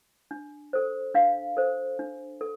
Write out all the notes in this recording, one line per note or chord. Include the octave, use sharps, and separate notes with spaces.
D4
A4 C5
D4 F5
A4 C5
D4
A4